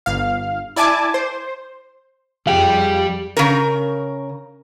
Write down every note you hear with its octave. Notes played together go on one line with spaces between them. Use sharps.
G1 F5
E4 D5 G#5 A5 D6
C5
F2 G3 G4 G#4 F5 G5
C#3 A#4